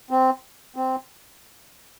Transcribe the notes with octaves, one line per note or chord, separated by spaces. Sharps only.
C4
C4